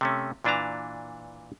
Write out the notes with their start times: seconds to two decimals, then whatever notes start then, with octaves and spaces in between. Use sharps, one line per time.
0.01 C3 A3 C#4
0.44 A#2 E3 D4 B4 A5 A#5